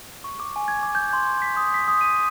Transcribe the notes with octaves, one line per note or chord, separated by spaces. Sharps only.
C#6
D6
G#5
G#6
D6
G6
C6
B6
D#6
B6
D#6
D#7